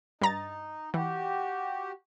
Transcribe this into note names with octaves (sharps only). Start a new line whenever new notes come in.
G2 D#4 A#5 A6
E3 F#4 G4